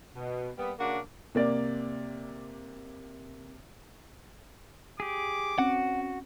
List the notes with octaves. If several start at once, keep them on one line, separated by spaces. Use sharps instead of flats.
B2
G3 A#3 B3
C#3 A#3 D4 F#4 A#4
C3 A#3 D5
G4 G#4 D6
C4 C#4 F#4 F#5